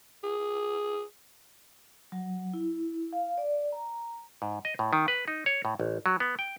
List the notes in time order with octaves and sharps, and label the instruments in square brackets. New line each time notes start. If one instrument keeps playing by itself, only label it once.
[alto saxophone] G#4
[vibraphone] F#3
E4
F5
D5
A#5
[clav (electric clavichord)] G#2
D#5
A2
D#3
B4
D#4
C#5
A2
A1
F#3
B3
G5